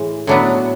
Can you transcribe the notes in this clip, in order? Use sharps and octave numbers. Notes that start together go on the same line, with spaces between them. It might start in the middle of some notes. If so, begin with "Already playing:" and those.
Already playing: A2 E3 G#3
A2 F#3 B3 D4